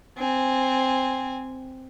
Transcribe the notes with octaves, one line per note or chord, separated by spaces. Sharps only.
C4 G#5